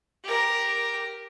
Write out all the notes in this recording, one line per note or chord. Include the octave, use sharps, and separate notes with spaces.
G4 A#4